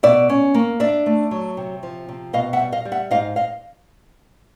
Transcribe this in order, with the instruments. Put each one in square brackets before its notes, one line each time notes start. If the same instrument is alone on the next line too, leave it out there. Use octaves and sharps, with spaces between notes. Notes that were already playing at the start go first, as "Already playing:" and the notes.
[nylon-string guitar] B2 D5 E5
C#4
A#3
D4 D5 E5
A3
F#3
C3
F3
C3
B2 D#5 F5
E5 F#5
G3
D#5 F5
G3
E5 F#5
G#2 D#5 F5
D#5 F5